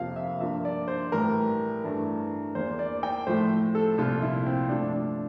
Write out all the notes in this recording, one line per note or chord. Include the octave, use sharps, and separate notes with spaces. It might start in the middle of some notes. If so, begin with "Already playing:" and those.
Already playing: F2 C3 F3 A#3 F5
E5
G2 F3 A#3 E5
D5
C5
A2 E3 G3 A#4
G2 E3 A3
E2 E3 A#3 C5
D5
G5
A2 F3 A3 C5
A4
C2 A#2 F3 F4
E4
C4
G2 F3 A3 D4
D4